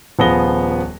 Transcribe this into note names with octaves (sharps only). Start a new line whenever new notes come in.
D#1 F3 B3 G#4 A#6 G7